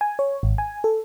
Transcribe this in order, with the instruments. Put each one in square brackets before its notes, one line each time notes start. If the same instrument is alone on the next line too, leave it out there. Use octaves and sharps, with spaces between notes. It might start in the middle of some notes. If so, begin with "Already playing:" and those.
[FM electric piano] G#5
C#5
G#1
G#5
A4